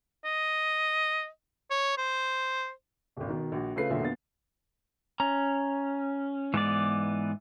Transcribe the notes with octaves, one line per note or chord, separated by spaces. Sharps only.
D#5
C#5
C5
D#1 G#1
B2 D#3
A#1 F#4
C#3 A3 F4 B4 C7
E1 A#2 D3 F#3 F#4 E5
A#2 B3 B4 A6
C#4 A#5
G#2 E3 B3 D5